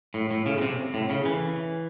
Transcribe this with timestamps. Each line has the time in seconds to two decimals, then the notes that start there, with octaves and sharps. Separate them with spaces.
0.14 A2
0.31 A2
0.46 C#3
0.58 C#3
0.61 C3
0.94 A2
1.10 C#3
1.25 E3